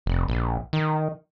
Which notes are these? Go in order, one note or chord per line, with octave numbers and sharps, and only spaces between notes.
F1
A#1
D#3